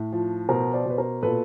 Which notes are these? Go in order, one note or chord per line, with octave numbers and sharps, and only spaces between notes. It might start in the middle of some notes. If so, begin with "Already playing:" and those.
Already playing: A2
F3
B2 A#4 C5
C5 D5
B2 B4
A#4 C5
A#2 A4 B4